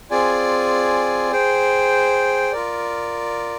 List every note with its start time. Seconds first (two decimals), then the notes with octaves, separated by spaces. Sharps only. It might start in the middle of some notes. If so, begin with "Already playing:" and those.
0.11 C4 F4 G#4 D5 G#5
1.32 G#4 C5 G5
2.52 F4 A#4 D5